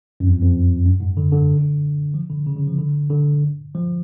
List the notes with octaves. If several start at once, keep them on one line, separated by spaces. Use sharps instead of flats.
F#2
F2
F2
F#2
G#2
D3
D3
F3
D3
C#3
C#3
F3
D3
D3
F3